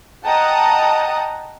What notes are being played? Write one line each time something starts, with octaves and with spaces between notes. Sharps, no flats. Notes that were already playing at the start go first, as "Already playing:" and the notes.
D#5 F#5 G5 A5 A#5 D#6